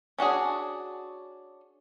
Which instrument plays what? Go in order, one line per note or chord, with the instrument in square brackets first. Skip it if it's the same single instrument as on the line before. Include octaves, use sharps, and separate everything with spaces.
[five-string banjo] C#4 D4 F#4 G#4